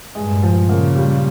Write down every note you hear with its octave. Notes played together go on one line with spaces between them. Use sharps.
G2 A#2 G#3
F3
A#2 C#3 A#3
G3